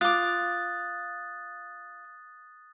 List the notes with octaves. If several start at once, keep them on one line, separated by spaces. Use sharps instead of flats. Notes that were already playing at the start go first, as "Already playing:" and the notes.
F4 D6 D#6 F#6 A6